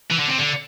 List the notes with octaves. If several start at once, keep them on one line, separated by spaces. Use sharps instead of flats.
E3
D3
C3
D3